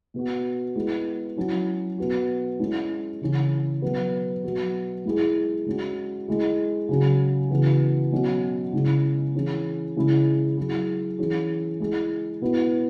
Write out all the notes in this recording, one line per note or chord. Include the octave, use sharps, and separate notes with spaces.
B2 B3 F#4
G#3 B3 E4 G#4
F#3 C#4 E4
B2 B3 F#4
G#3 C#4 E4
C#3 E3 C#4
B2 F#3 B3
B2 F#3 B3 F#4
G#3 E4 G#4
G#3 C#4 F#4
G#3 E4 G#4
C#3 F#3 C#4 F#4
C#3 E3 B3 F#4
B2 F#3 C#4 F#4
C#3 G#3 C#4 E4
E3 C#4 G#4
C#3 G#3 C#4 E4 G#4
F#3 E4 G#4
E3 C#4 G#4
G#3 E4 G#4
B2 B3 E4